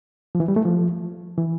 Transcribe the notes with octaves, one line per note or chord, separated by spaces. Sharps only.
F3
E3
G3
A3
F3
E3